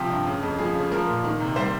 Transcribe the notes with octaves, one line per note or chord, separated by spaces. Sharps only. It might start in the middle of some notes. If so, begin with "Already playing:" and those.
Already playing: C3 F3 G4
G2
C#3
F2
F3 G#4
C#3
F3 A#4
A#2
D#3
C3
G3 C5